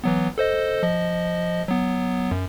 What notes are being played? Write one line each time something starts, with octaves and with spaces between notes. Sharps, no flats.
E3 F#3 B3
A4 C5 D#5
F3 D#5
F#3 B3
F#2